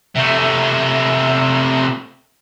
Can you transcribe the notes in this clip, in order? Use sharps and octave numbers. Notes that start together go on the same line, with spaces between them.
C3 A3